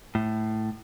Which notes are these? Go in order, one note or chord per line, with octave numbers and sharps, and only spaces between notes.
A2